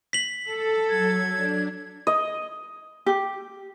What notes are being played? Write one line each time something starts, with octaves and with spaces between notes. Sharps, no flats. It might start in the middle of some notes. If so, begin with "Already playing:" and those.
B6 F#7
A4
F#3 G#6
D4
D#5
G4